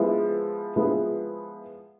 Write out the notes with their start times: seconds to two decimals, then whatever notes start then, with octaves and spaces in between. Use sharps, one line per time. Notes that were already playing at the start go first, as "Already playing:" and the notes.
Already playing: F3 G#3 B3 E4 G#4
0.76 F3 G#3 B3 E4 G#4